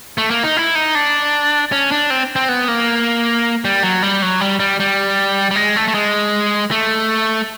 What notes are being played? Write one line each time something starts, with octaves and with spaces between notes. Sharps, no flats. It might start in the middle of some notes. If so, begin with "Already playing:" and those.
A3
A#3
D#4
E4
D#4
D4
C#4
D4
C4
C4
B3
A#3
G3
F#3
G3
F#3
G3
G3
G3
G3
G#3
A3
A3
G#3
A3